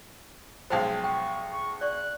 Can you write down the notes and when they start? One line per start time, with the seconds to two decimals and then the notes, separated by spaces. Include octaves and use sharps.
0.70 B1 F3 G#3 C5 G5
1.04 G5 C#6
1.53 C#6
1.81 D5 C#6 F#6